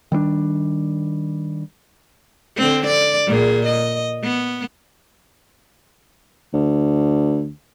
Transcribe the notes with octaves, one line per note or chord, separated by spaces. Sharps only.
D#3 G3 C4 D4
D3 C4
D5
A#2 G#4
D#5
B3
D2